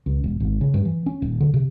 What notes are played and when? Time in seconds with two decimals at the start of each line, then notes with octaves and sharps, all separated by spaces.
0.06 C#2
0.24 E1
0.40 G#1
0.61 C#3
0.74 G2
0.85 E3
1.06 C#4
1.22 D#1
1.41 D3
1.54 C3